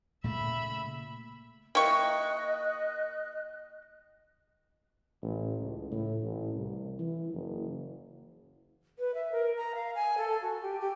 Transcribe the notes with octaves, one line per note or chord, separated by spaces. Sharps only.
A#2 C#3 A3 E5 B5
A#3 E4 G4 D#5 C#6 F#6
A1
C#2
A2
A1
C2
E3
F#1
B4
E5
A#4
A#5
F5
G#5
A4
F#4
G4
G4